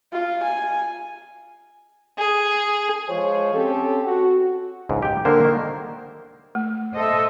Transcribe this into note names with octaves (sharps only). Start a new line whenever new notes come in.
F4
G#5
G#4
F3 G#3 F4 C5 C#5
C4 C#4 G4 A4
F#4
C#2 G#2
G4 G5
D3 A#3 A#4 C5
D#3 A#3
A3
A4 C5 D#5 E5